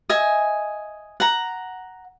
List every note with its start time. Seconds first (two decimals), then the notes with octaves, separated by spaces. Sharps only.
0.09 D#5 E5 G#5
1.20 F#5 A#5